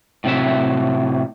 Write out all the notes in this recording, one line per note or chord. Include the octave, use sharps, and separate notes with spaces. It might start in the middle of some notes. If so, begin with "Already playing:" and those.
A2 C3 F#3 E5